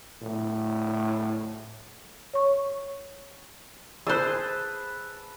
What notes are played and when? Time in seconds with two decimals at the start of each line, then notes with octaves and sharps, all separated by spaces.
0.22 A2
2.34 C#5 C#6
4.07 G#4 B4 C5 A5 E6